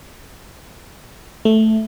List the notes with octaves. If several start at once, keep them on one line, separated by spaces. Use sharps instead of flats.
A3